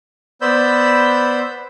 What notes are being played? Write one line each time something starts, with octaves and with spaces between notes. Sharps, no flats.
B3 C5 D5 B5 E6 G6